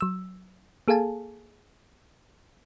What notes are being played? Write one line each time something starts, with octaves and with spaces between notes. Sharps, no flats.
F#3 E6
A#3 G#4 A4 F5 G#5 A5